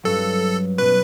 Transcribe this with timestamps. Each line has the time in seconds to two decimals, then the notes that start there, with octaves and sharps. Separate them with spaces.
0.03 G2 F#3 C#4 F#4 A4
0.78 B2 F#3 C#4 B4